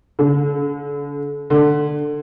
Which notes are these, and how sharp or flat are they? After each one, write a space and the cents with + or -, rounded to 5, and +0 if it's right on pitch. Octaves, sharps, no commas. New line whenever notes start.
D3 -40
D3 +15